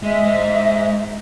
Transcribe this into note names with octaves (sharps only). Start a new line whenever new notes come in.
G#3 D#5 E5
G#3 C5